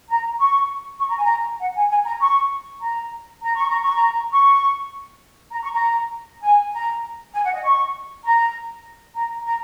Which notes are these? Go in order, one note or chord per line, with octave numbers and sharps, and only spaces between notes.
A#5
C#6
C#6
A#5
G#5
A#5
F#5
G#5
G#5
A#5
C#6
A#5
A#5
C#6
A#5
C#6
A#5
C#6
A#5
C#6
A#5
G#5
A#5
G#5
F#5
D#5
C#6
A#5
A#5
A#5